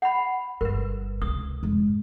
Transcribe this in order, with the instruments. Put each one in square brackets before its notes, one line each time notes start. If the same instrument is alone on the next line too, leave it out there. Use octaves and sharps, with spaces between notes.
[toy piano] F#5 B5
[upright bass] G1 [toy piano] A#4 B4
[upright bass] C#2 C3 [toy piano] D#6
[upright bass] F1 G#2